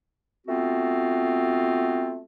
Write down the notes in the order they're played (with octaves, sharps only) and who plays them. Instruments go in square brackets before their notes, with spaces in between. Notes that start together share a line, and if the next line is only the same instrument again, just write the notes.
[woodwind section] A3 B3 C4 F4 F#4